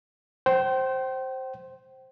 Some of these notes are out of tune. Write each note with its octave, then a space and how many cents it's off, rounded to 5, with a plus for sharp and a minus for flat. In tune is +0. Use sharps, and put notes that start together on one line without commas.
C5 +10 G5 -35